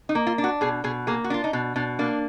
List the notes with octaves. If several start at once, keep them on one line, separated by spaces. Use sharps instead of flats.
D#4
A#3
F4
D4
F#4
B2 G#4
B2 G#4
A#3 G#4
F#4
D4 F4
D#4
B2 D4
B2 D4
A#3 D4